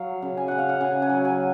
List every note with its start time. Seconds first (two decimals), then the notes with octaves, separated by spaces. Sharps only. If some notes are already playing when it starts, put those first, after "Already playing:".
Already playing: F#3 F5
0.22 C#3
0.37 G#5
0.48 C#3 F#5
0.58 F5
0.69 F#5
0.80 C#3 G#5
1.02 G#5
1.09 F#3
1.25 G#5